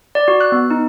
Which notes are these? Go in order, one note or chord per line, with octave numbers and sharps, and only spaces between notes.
D5
F#4
F#6
B3
D#4